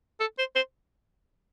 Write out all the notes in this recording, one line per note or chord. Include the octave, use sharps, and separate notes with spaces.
A4
C5
C5